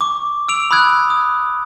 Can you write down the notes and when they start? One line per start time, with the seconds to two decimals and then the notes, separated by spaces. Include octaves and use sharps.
0.01 C#6 D6
0.48 E6 D7 F7
0.71 B5 D#6 E6 F#6 G#6
1.10 D#6